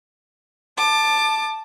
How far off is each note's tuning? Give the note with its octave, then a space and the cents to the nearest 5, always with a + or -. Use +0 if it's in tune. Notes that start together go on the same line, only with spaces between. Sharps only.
A5 +0 D6 +25